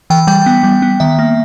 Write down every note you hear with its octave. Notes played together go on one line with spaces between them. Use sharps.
E3 G5
G3 G5
B3
G3
B3
D#3 E5
A#3